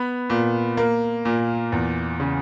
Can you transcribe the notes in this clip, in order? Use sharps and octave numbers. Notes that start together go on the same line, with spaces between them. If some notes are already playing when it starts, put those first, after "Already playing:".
Already playing: B3 B5
A#2
A#3
A#2
E2
C#3